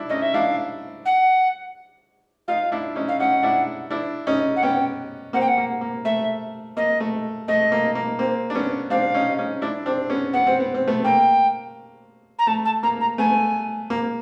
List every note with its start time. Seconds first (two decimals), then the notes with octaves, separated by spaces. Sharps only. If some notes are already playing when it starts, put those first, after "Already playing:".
Already playing: D4 E4
0.09 C#4 D#4 D#5
0.22 E5
0.34 D4 E4 F5
1.05 F#5
2.48 D#4 F4 F5
2.72 D4 E4
2.96 C#4 D#4
3.08 F5
3.20 C#4 D#4 F#5
3.43 D4 E4
3.90 D4 E4
4.27 C#4 D#4
4.56 F#5
4.63 B3 C#4 G5
5.33 A#3 C4 F#5
5.41 G5
5.48 F#5
5.58 A#3
5.81 A#3
6.05 A3 E5
6.77 A#3 D#5
7.00 A3
7.48 A3 D#5
7.72 A#3
7.95 A#3
8.19 A#3 C4
8.50 D4
8.55 B3 C#4
8.90 C4 D4 F5
9.14 C#4 D#4
9.38 C#4 D#4
9.62 D4 E4
9.86 C4 D4
10.09 B3 C#4
10.33 B3 F#5
10.47 C4
10.60 B3
10.74 C4
10.87 A3 B3
11.04 A#3 G5
12.39 A#5
12.47 A3 A5
12.65 A5
12.83 A#3 A#5
13.01 A#5
13.18 A3 B3 G#5
13.90 A#3